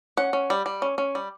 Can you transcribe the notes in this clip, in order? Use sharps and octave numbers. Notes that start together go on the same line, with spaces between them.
C#4 F#5
C#4
G3
G3
C#4
C#4
G3